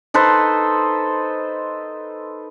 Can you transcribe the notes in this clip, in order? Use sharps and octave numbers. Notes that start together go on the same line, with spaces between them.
D#4 A4 B4 C5